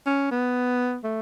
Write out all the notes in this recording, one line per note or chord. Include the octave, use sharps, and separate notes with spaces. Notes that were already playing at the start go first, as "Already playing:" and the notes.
C#4
B3
A3